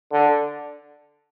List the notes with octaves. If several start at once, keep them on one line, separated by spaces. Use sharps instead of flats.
D3